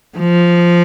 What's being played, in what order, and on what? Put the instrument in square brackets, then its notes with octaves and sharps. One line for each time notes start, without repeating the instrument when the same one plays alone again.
[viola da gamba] F3